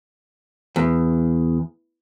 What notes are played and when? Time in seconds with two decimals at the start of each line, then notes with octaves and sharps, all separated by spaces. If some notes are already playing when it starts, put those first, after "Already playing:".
0.76 E2